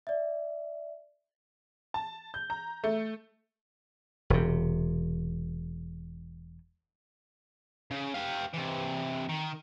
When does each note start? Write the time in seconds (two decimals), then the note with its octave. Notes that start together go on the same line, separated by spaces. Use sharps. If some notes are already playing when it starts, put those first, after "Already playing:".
0.07 D5 E5
1.94 A5
2.34 G6
2.50 A#5
2.84 A3
4.30 E1 C3
7.91 C#3
8.14 G4 F5
8.54 C3 E3
9.29 D#3